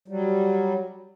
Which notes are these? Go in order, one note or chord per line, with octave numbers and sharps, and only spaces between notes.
F#3 G3